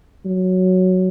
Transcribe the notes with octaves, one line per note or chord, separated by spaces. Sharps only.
F#3